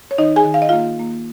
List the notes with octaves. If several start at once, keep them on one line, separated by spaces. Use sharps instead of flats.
C#5
D#3 D#4 D#5
G#4 G#5
D#3
F5
D#5
A#3 F4 F5
A#3